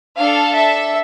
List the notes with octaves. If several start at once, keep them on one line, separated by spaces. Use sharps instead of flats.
D4 A4 F5
E5